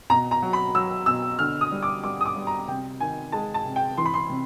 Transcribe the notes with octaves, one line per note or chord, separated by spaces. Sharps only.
B2 A#5
A#5
F#3
B5
F#3 E6
B2 E6
D3 F6
D#6
G3
D6
G3 D6
D#6
D6
G3
A#5
C3 G5
D#3 G#5
G#3 A5
A5
C3
G5
E3 C6
B5
C6
C3